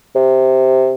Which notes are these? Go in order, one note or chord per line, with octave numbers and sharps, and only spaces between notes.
C3